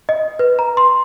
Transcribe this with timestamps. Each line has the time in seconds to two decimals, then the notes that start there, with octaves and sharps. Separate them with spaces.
0.09 D#5
0.39 B4
0.59 A#5
0.77 C6